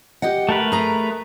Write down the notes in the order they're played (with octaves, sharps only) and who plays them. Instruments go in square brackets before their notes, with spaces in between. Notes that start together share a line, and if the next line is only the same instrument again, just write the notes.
[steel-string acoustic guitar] G4 D#5 F#5
[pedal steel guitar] A3 A#4 B4
[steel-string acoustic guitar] G#4 A#5